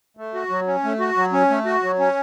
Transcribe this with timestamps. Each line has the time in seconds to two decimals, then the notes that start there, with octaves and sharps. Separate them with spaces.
0.17 A3
0.34 F#4
0.50 F#3
0.67 C#4
0.84 A3
1.00 F#4
1.17 F#3
1.33 C#4
1.50 A3
1.65 F#4
1.83 F#3
1.99 C#4